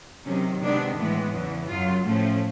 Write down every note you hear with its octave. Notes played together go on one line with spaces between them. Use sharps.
C3 D#3 F#3 C#4
C3 D#3 G#3 B3 D4
A2 E3 G#3 B3
E2 C#3 E3
F#2 C#3 F#3 F4
A2 F3 A3 C#4